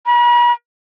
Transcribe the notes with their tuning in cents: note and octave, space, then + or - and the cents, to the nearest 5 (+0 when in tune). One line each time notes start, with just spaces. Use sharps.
B5 -45